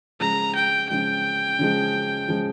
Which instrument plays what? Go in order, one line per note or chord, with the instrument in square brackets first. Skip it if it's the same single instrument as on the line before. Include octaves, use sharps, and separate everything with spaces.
[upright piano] C#3 F3 G#3 [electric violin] A#5
[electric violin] G5
[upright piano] C#3 F3 G#3 [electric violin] G5
[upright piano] C#3 F3 G#3
C#3 F3 G#3